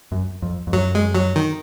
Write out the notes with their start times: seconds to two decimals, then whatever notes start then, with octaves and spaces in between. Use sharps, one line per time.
0.12 F#2
0.42 F2
0.67 F2
0.73 F#2 F#3
0.95 G#3
1.15 F#3
1.36 D#3